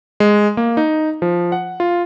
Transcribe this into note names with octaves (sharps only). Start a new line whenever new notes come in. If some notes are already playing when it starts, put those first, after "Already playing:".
G#3
A#3
D#4
F3
F#5
F4